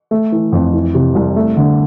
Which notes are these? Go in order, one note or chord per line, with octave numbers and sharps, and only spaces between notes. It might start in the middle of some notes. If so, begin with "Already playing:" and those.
A3
E3
F2
E3
C3
C2
A3
D3